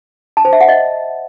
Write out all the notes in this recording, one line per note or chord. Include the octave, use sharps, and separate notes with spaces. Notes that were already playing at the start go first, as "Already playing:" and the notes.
A5
C5
E5
F#5
D#5